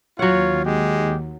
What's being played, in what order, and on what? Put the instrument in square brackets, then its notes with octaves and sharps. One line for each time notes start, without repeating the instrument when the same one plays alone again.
[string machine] D#2 [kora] F#3 F#5 [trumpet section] F4 C#5
[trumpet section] G#3 G4